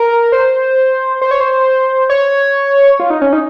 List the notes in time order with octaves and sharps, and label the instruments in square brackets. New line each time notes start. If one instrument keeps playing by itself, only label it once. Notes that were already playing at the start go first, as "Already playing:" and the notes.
Already playing: [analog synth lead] A#4
C5
C5
C#5
C5
C#5
F4
D#4
C#4
D#4